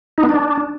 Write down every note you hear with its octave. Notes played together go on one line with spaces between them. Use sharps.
D#4
B3
D4